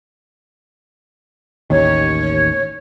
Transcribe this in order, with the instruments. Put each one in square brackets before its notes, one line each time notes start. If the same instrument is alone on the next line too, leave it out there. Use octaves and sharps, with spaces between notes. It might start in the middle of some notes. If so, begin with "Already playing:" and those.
[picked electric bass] A1 D#2 D#3 [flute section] C#5